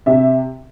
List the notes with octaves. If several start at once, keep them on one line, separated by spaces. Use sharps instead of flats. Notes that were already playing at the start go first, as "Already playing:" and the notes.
C3 E5